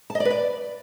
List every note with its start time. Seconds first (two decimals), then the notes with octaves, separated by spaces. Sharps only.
0.10 A5
0.15 D#5
0.20 D5
0.25 B4
0.30 D5